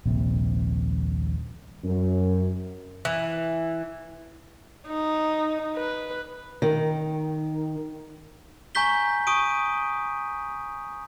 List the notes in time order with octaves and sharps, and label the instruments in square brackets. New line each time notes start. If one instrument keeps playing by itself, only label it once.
[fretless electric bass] D#1 A#1 C3
[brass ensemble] F#2
[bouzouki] E3
[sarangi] D#4
B4
[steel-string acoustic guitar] D#3
[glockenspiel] G#5 A#5 C#6 G6 B6 G7
C#6 D#6 D7 D#7